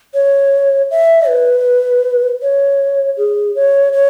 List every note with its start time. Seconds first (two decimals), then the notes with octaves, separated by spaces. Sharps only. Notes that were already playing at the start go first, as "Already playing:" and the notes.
0.14 C#5
0.91 E5
1.28 B4
2.42 C#5
3.17 G#4
3.55 C#5
3.93 C#5